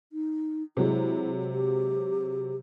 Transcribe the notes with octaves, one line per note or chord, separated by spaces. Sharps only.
D#4
C3 F#3 G#3 E4
G4